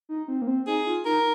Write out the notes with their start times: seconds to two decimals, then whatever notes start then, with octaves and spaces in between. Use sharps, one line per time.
0.09 D#4
0.28 C4
0.42 A#3
0.47 C4
0.67 D#4 G#4
0.86 F4
1.06 D#4 A#4